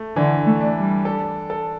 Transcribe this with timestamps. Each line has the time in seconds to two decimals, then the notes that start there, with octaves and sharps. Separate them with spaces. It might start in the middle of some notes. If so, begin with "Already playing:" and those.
Already playing: A3
0.16 D3 E3
0.46 A3
0.61 D4
0.76 G3
1.05 A4
1.50 A4